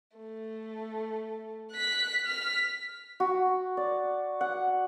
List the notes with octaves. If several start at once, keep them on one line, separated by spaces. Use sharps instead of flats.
A3
F#6 B6
F6 B6
F#4
D5
F#5